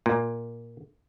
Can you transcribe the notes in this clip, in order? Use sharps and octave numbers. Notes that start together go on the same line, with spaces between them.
A#2